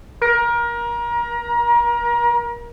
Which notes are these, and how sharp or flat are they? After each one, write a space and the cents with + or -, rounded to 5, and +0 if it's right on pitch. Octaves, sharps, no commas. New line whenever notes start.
A#4 +30